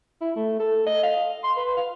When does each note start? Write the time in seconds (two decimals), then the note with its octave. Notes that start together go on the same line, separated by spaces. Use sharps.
0.21 E4
0.36 A3
0.60 A4
0.87 D#5
1.03 F5
1.44 C6
1.57 B4
1.77 F5